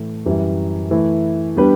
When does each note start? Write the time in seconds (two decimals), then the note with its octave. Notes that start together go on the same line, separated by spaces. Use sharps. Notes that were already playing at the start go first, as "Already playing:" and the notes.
Already playing: A2 E3 A3
0.26 F#2 E3 G3
0.91 E3 A3 E4
1.56 B2 G3 D4 G4 B4